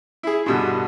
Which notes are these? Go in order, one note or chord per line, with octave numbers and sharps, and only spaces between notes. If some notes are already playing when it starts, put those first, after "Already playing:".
E4 G#4
G2 B2 D3